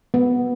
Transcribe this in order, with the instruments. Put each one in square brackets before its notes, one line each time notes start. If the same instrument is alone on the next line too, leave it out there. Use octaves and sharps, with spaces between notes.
[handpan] B3